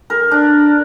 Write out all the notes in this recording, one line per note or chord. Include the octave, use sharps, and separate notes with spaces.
A#4
D4